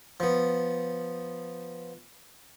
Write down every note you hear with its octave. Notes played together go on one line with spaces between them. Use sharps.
F3 B3